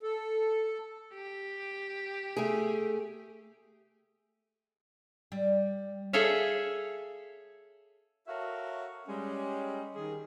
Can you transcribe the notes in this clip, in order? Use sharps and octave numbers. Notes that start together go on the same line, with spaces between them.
A4
G4
A3 G#4
G3
G#4 A4 C#5 E5 F5
F#4 A4 A#4 C#5 E5 F5
G3 G#3 C#4
D#3 G#4